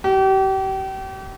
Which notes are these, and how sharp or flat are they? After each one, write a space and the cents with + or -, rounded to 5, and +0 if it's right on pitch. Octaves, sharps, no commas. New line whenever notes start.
G4 -35